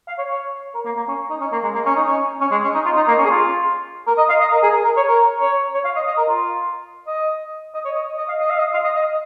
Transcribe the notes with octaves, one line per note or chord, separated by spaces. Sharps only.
F5
C#5
C#5
A#4
A#3
A#3
C#4
D#4
C#4
A#3
G#3
A#3
C#4
D#4
C#4
C#4
G#3
C#4
D#4
F4
D#4
A#3
C#4
G#4
F4
A#4
D#5
F5
D#5
A#4
G#4
A#4
A#4
C#5
A#4
C#5
C#5
F5
D#5
D#5
A#4
F4
D#5
D#5
C#5
D#5
D#5
F5
D#5
F5
D#5
F5
D#5
D#5